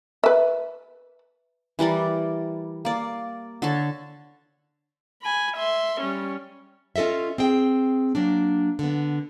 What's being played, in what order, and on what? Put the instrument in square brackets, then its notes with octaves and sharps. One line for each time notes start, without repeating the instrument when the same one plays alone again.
[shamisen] B4 E5
[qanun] E3 G3 A#4 D5
A#3 D5
D3 A4 C#5 A5
[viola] G#5 B5
E5 C6
G3 C#4
[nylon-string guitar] C#4 F4 A4 D#5 E5
C4 G#4 G5
F#3 A#3 D4
D3 B3